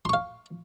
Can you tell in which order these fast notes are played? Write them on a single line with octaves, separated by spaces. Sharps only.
C6 C#6 F5